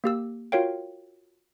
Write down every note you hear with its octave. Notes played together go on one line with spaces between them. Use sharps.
A#3 G4 E6
F4 F#4 A#4 C#5 F5 G5